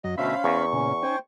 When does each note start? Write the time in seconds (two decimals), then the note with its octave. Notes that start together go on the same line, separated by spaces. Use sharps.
0.04 F#2 F#3 D#5
0.18 D2 B2 C#4 C5 E5 F5 B5
0.44 E2 C#6
0.73 A#2 C#3 C#4
1.03 C#4 D#4 C5 G5 G#5